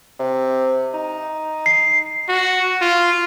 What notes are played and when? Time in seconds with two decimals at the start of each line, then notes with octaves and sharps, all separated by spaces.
0.19 C3
0.94 D#4
1.66 C7
2.29 F#4
2.81 F4